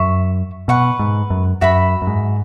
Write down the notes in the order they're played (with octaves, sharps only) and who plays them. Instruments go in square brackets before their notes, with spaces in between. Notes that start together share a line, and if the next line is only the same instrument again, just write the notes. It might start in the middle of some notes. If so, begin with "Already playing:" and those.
Already playing: [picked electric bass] F#2 [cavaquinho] E5 C#6
[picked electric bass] B2 [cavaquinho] B4 F#5 C#6
[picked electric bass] G#2
F#2
[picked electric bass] F#2 [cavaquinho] F#4 E5 B5
[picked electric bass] F#2
G#2